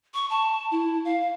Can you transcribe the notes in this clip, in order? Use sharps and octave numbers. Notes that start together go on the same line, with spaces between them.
C#6
A5
E4
F5